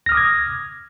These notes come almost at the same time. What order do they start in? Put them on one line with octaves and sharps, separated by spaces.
A#6 F6 D#6 D6 G#6